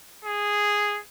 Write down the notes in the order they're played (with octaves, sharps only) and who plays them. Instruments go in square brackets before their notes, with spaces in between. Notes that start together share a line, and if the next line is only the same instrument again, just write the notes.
[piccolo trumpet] G#4